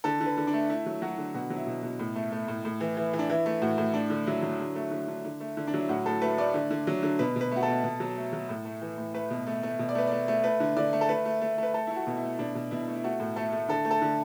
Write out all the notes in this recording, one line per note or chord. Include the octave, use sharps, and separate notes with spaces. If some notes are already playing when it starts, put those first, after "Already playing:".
D3 A4
D3
B4
D3
D4
A3
A3 E4
F#3
F#3 F#4
D3
B2 F#4
F#3
E4
B2
B2
A2
A3
A3
A2
A2
E3
E3
E3
D4
E3 E4
A3
A2 F#4
A2
A3 D4
D3
F#3 E4
F#3
D3
A3
D3
D3
D3
A3
D3
D4
F#3 E4
A2 F#4
A2 A4
A3 B4
A3 D5
D3
D3
F#3
D3
B2 B4
B2 B4
A3 F#4
A4
B2
B2
F#3
A3
F#3
A2
A3
E3
A2
A3 B4
B2
A3
A3
B2
D5
A3 B4
A3 D5
A3
A3 B4
D3
D3 D5
A3
A4
A3 B4
A3
A3
A3
B4
A3 A4
A3 E4
F#4
B2
E4
A3
B2 D4
B2
B2 E4
A3
E4
A3 F#4
A2
A3 A4
A3
D3 A4
A3
A4
D3